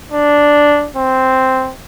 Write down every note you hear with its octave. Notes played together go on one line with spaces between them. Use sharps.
D4
C4